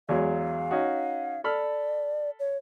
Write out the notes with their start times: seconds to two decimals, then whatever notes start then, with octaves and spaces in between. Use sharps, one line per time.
0.09 E2 F#3 G#3 F5
0.71 C#4 D#4 F#4
1.44 A4 D5 B5 F6
2.40 C#5